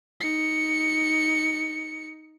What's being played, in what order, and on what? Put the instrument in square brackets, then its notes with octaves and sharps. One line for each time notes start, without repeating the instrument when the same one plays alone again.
[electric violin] D#4 C#7